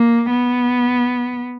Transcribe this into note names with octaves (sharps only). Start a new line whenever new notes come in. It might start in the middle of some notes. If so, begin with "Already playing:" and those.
Already playing: A#3
B3